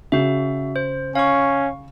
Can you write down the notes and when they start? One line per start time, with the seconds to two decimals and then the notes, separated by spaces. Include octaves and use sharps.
0.12 C#3 F#4 E5
0.76 C5
1.15 C#4 F5 C#6